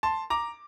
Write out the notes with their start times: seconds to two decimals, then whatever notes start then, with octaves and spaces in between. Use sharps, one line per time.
0.03 A5 C6
0.30 A#5 D6